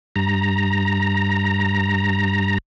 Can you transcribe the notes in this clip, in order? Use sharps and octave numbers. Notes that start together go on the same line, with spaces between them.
G2 A#5